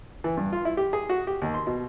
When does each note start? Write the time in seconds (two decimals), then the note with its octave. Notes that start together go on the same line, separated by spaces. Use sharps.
0.24 E3
0.37 G2
0.52 F4
0.65 E4
0.77 G4
0.93 G#4
1.09 F#4
1.27 G4
1.42 D#2
1.54 C6
1.67 B2